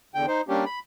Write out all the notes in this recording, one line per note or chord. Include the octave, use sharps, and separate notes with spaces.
E2 D3 G5
D#4 C5
G3 A#3 C#4 D4 G4
B5